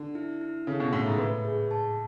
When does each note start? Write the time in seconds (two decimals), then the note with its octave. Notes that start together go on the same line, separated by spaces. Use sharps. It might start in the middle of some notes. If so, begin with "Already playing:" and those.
Already playing: D3
0.15 E4
0.41 E4
0.67 C#3 A4
0.80 B2
0.93 A2 E5
1.06 G#2
1.18 A2 B4
1.45 G#4
1.71 A5